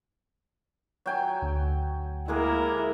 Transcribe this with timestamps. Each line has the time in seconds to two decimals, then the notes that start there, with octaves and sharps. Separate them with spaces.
1.06 F#3 G5 G#5
1.42 D2
2.28 G#3 A#3 E4 G#4 A#4